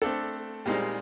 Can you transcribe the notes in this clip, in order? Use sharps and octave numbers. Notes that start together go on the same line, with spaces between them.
A3 C4 D4 A4
A#2 G3 G#3 C4 D#4